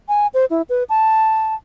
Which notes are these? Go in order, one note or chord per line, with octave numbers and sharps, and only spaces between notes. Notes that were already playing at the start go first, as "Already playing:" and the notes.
G#5
C5
E4
B4
A5